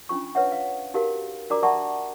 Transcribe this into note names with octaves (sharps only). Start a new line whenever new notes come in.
C#4 D4 F4 C#6
B4 C#5 E5 F#5
F5
D#4 F#4 G4 A#4 F5
D4 F#4 A#4 D5 A#5 D6
D5 E5 F#5 A5 A#5 C#6